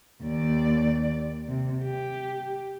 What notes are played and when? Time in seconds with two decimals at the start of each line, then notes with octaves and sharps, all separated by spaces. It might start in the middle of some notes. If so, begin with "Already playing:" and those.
0.23 D#2 D5
1.48 C3
1.82 G4